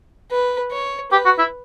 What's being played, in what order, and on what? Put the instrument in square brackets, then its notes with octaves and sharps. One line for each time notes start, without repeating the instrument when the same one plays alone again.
[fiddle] B4
C#5
[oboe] G4 [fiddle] B4
[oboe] F#4
E4